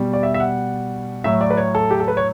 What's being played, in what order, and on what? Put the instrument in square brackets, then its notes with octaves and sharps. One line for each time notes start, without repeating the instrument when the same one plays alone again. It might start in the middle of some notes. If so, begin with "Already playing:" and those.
Already playing: [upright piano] B2 G3
D5
E5
E5
F#5
A2 F#3 E5
D5
B4
C#5
A4
G4
A4
B4
C#5